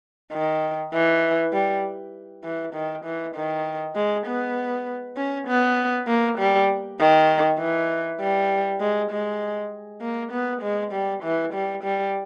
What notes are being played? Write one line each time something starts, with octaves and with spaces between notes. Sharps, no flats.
D#3
E3
G3
E3
D#3
E3
D#3
G#3
B3
C#4
B3
A#3
G3
D#3
E3
G3
G#3
G#3
A#3
B3
G#3
G3
E3
G3
G3